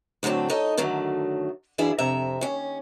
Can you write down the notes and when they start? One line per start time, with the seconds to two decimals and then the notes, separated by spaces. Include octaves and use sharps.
0.23 D2 A2 F#3 C4 D4
0.50 D#4 A4 C#5 D#5
0.77 F#2 D3 D#3 F#3 A3
1.78 F#2 E3 D4 E4 G#4 F5
1.98 F2 C3 E5 A#5
2.41 D#2 C#4